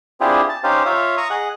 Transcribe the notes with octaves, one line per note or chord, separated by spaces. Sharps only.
C4 D4 E4 F4 G4 G#4
A5
C#4 D#4 G4 C5 F5
F4 C#5 E5 F5
A#5 C#6 D#6
G#4 D#5 F#5